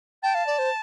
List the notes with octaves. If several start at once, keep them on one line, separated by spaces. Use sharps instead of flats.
G5 A5
F5
D5
C5